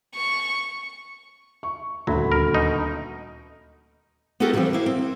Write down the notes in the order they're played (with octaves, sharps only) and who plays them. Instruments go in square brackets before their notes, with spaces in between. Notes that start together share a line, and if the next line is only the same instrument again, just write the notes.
[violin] C#6
[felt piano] C#6
[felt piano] D#1 D2 B5 [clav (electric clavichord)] F#3
[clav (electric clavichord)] A#4
B2 D#4
[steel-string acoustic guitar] B3 E4 F#4 G4 A4 A#4
D3 E3 F3 G3 C4
A#3 E4 F5
C4